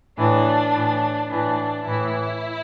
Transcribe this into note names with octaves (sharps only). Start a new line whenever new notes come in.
A2 E3 D4
A2 E3
A2 E3 D4
A2 E3 E4